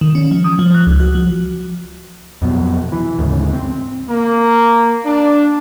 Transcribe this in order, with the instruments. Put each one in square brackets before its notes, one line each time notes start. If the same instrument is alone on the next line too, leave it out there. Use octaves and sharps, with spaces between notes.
[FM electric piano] D#3
C#4
F3
D#6
F3
F#6
C#2
F#4
F3
[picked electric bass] F2 B2 F#3
E3
D2 G#2 C#3
C4
[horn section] A#3
D4